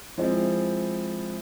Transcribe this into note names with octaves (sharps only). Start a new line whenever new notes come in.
F3 G#3 C4 E4